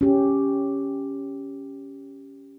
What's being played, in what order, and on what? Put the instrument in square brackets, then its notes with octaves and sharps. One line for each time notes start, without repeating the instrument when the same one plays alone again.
[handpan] C#4 G4